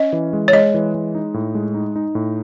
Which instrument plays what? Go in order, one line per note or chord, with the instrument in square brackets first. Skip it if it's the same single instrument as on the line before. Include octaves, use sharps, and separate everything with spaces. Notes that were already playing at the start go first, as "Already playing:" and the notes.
Already playing: [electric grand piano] C#4 [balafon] D#5
[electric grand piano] E3
G#3
[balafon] C#5
[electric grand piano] G#3 [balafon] D#5
[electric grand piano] E3
G#3
D#4
A2
G#3
D#4
D#4
A2